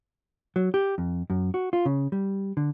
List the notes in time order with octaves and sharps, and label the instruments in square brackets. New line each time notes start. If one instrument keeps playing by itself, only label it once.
[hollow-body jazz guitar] F#3
G4
F2
F#2
F#4
F4
C#3
G3
D3